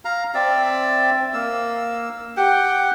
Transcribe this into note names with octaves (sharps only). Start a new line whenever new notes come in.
F5 A#5
C4 D5 E5
A#3 E6
G4 F#5 G5